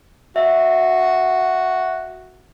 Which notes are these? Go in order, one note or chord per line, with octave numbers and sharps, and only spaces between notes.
F#4 E5